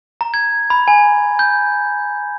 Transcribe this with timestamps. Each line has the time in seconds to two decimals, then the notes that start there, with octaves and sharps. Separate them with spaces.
0.21 A#5
0.34 G#6
0.70 B5
0.88 G#5
1.39 G6